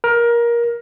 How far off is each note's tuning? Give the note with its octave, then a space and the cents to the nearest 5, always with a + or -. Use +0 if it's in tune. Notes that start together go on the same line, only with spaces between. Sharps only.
A#4 +20